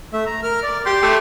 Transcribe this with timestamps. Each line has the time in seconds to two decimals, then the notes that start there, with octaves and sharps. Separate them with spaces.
0.13 A3 E5
0.26 A#5
0.43 A#4 F6
0.63 D5
0.86 G4 C6
1.02 A3 G4